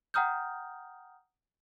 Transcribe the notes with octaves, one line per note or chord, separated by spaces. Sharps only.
F#5 G5 A#5 D#6 F6 G6